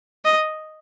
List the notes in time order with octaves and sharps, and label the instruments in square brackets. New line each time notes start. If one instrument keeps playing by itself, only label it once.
[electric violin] D#5